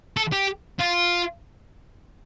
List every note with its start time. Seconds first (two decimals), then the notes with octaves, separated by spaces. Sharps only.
0.17 A4
0.32 G4
0.79 F4